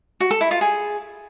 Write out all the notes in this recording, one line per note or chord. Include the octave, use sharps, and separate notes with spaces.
F#4
A4
E4
F4
G#4